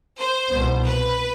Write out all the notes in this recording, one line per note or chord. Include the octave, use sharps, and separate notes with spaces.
C5
C2 B2 B3
B4